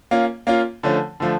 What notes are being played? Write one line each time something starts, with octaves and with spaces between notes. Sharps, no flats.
A#3 C#4 F4
A#3 C#4 F4
D3 F3 A3 C#4
D3 F3 A3